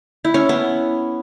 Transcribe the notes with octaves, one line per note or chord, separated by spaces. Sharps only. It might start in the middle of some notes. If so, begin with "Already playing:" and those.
E4
C#4
B3